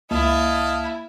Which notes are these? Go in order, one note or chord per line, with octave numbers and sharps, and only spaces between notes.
C#2 A#3 E4 D#5 F5 A5